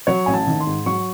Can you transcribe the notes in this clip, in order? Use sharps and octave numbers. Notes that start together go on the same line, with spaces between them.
F#3 C#5
A1 G#5
A5
D#3
C6
G#2
F#3 C#6